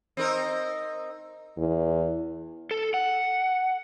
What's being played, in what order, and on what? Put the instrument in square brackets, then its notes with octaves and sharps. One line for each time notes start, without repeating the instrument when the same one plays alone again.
[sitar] C4 D#4 A#4
[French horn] E2
[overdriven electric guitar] A4
F#5